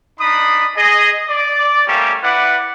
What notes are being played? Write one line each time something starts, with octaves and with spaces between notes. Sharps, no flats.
D4 D#4 B5 D#6
G#4 D#5
D5
G3 A3 A#3 C#4 G4
E4 B4 D5 F#5